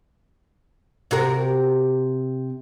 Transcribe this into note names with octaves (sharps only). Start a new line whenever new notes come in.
C3 F#4 A#4